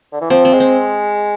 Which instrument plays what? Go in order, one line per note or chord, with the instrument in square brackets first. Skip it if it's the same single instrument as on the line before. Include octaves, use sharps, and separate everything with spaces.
[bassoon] D3
E3
[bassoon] F3 [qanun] C4
[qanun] C4
[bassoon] G#3
[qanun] C4